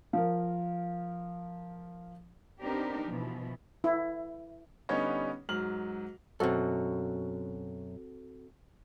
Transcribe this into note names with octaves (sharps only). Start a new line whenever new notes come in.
F3 A#4 F5
B3 C4 D4 D#4 G4 A#4
B2 E3 F3
E4
D3 G3 B3 C#4 D#4 C#5
G#2 F#3 F6 F#7
F#2 B2 C4 F#4 A4